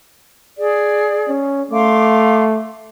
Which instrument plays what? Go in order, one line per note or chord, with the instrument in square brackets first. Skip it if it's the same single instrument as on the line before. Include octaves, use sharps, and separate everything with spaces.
[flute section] G#4 D5
[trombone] C#4
[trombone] A3 [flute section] F5 C6 D6